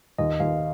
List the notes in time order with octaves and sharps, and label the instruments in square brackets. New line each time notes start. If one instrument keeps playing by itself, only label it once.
[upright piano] D#2 [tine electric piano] D#5
[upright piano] D#2 [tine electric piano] F5